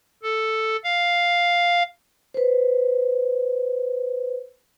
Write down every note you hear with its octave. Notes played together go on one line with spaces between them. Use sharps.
A4
F5
B4 C5